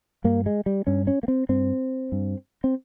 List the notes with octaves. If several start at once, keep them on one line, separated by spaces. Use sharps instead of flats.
G2 A#3
G#3
G3
G2 C#4
C#4
A#3
C4
G2 C4
G2
C4